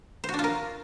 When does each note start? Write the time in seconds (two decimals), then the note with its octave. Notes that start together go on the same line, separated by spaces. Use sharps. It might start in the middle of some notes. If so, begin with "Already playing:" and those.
0.24 C5
0.29 F#4
0.34 D4
0.39 F4
0.44 A#4